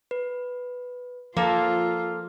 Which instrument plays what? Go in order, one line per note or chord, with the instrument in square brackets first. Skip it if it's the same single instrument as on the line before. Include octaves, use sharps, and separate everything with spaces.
[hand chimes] B4
[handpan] F3 [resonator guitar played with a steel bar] A#3 A4 [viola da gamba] F4 [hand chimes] F5